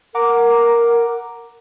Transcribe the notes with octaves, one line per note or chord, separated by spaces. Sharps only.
A#4 F#5 A#5 D6